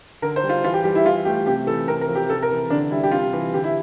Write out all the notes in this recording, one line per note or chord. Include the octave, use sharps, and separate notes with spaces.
D3 A#4
C5
G3
F4
E3 F4
G4
G3 G4
E4
E3 F4
A3 G4
C3 G4
E3 A4
C3 A#4
A#4
F3
G4
C3 A4
A#4
E3
D3 D4
G3 E4
G4
C3 F4
E3
D3 G4
E4